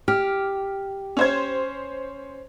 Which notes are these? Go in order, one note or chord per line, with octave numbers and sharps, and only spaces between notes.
G4 F6
C#4 C5 G#6